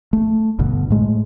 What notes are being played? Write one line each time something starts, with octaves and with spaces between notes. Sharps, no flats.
A3
G1 G2 B2 D3
A2 G#3 A3